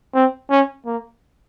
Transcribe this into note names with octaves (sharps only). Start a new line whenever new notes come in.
C4
C#4
A#3